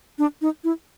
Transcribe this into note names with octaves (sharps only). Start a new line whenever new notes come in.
D4
D#4
E4